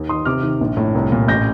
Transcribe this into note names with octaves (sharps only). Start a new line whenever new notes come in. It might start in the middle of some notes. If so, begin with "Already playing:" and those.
Already playing: D#2
D#3 C6 D#6
C3 D6 F6
D#3
A#1
A2
C2
A#2
A1 G6 A#6